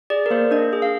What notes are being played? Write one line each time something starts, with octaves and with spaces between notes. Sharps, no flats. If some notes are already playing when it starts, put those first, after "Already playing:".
G#4 D5
A#4
A#3 C5
D4 D#5
G#4
F5